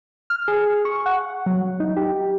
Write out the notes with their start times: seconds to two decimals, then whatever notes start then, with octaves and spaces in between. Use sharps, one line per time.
0.30 F6
0.48 G#4
0.85 C#6
1.06 F#5
1.46 F#3
1.80 D#4
1.97 G4